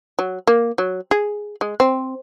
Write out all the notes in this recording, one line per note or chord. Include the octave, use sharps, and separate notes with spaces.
F#3
A#3
F#3
G#4
G#3
C4